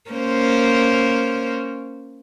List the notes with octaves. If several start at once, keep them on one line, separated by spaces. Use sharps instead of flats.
A#3 C#4 C5